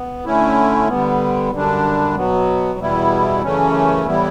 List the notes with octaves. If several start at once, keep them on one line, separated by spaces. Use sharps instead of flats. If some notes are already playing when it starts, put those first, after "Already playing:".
Already playing: B3
D3 A3 C#4 E4
D3 G3 B3
F#2 D3 G3 D4
B2 F#3 B3
E2 B2 G3 B3 E4
F#2 C#3 E3 A3 C#4
A2 E3 G3 B3 E4